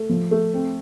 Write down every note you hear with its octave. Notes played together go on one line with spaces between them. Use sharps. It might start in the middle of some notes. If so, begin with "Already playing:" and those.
Already playing: A3
F3
A3
C4